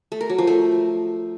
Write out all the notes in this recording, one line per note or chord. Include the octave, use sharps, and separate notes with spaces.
A3
A#4
F#3
F3
A3